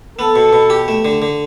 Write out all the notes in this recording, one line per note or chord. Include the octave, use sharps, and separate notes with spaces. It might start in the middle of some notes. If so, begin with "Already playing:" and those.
B3 A4
B2
B2
G4
A3
D3
D3